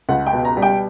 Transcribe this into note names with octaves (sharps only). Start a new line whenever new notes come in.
C#2 F#5
G5
B2
A#5
G3
G5